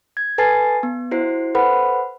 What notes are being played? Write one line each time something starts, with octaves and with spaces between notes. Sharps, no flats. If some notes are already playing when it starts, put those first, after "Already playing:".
G#6
A4 B4 G#5 A5 A6 C7
B3
E4 F#4 C5 C7
A4 B4 C5 F#5 B5